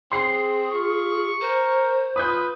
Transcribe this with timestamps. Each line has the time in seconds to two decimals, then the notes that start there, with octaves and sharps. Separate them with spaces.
0.12 C4 G#4 C6 C7
0.71 F4 C#6
1.41 A#4 C5
2.16 F4 B4 D#6 G6